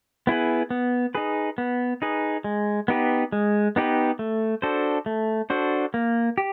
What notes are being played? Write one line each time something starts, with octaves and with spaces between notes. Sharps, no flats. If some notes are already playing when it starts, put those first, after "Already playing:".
B3 E4 G#4 B4
B3
D#4 G#4 B4
B3
D#4 G#4 B4
G#3
B3 D#4 G4 B4
G#3
B3 D#4 G4 B4
A3
D4 F#4 A4 C5
A3
D4 F#4 A4 C5
A#3
G4